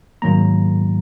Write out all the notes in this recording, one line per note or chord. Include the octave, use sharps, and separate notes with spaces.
G#2 D#3 F#3 A#3 A#5